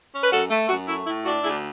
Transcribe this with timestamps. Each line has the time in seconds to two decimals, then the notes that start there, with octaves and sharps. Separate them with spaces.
0.14 C#4
0.23 B4
0.32 F#2 F#4 A4
0.50 A3
0.69 F#2 F#4
0.87 A3 E4
1.07 A2 E4
1.25 D4 F#4
1.43 D2 E4 G#4